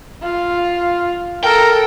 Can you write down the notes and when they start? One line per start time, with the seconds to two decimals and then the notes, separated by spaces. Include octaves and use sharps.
0.22 F4
1.44 A4 A#4 G5